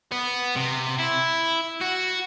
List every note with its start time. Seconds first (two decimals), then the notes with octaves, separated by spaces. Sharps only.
0.12 B3
0.56 C3
1.00 E4
1.81 F#4